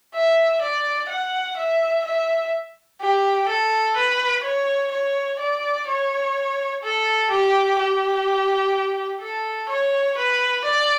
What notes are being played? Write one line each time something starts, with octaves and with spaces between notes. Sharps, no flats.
E5
D5
F#5
E5
E5
G4
A4
B4
C#5
C#5
D5
C#5
A4
G4
G4
A4
C#5
B4
D5